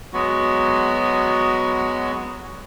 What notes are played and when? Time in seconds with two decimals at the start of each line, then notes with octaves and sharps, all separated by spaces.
0.13 F#3 G#3 B3 F#4